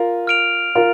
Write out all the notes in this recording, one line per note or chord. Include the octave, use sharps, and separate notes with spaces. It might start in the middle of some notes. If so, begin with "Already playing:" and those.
Already playing: F4 A#4
F6 D7 F7
F4 A#4